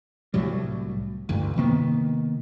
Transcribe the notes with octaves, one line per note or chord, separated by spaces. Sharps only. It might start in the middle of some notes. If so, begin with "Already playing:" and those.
C2 A2 F#3 G3
A1 D2 G2
C3 D#3 A#3 B3